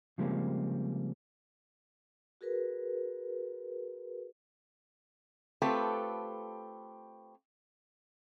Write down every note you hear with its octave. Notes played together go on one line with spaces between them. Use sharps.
C#3 F3 G3 G#3 A#3 C4
F#4 G#4 A#4 B4
A3 C4 F4 G4 A4 B4